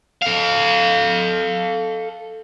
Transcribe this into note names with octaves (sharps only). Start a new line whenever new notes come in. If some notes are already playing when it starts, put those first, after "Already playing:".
A4 F5